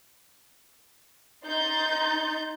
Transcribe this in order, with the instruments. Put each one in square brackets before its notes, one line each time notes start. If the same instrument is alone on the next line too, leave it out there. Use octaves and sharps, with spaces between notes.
[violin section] D#4 C6 G6 A6